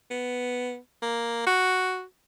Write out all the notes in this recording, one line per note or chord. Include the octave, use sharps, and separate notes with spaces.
B3
A#3
F#4